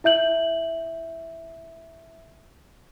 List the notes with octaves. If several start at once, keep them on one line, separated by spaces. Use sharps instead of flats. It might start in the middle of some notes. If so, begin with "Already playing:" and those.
E4 E5 G6 F#7